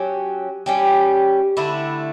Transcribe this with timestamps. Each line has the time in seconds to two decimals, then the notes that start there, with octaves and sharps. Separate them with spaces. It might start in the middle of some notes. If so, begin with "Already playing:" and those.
Already playing: F#3 C#4 G4
0.66 G3 C#4 G4
1.57 D3 A3 E4